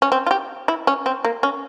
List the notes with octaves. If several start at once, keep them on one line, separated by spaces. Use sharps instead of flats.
C#4
C4
F4
G4
E4
C#4
C4
A#3
C#4